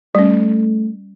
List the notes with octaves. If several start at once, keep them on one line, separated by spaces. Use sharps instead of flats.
G3 A3 C#4